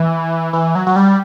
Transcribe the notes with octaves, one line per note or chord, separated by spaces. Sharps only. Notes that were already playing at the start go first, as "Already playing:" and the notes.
Already playing: E3
E3
F#3
F#3
G3